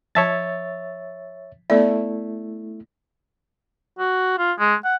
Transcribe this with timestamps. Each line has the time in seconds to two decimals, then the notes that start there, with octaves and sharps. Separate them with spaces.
0.15 F3 C#5 E5 A5 A6
1.70 A3 B3 E4 D5 E5
3.99 F#4
4.38 F4
4.59 G#3
4.84 F#5